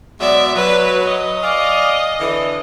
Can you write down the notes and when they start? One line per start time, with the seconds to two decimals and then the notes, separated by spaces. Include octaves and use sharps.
0.20 B2 F#3 G#3 D5 E5
0.56 F#3 B4
1.05 D#5
1.43 G#4 D5 F5
2.20 D3 E3